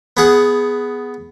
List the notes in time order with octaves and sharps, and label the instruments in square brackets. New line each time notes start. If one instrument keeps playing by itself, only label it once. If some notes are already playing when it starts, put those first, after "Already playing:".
[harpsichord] B3 G#4 F#5